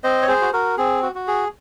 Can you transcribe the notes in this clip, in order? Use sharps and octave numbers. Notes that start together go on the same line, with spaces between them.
C4 C5 D#5
C#5
G#4 C5
F#4
F#4 A#4
C4 G#4
F#4
F#4
G#4